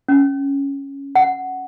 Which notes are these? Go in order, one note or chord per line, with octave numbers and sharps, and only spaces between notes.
C#4
F#5